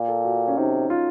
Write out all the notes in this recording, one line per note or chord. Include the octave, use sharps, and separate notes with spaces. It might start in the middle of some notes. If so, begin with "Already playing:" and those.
Already playing: A#2
A4
F#4
C#4
C3 D#4
F4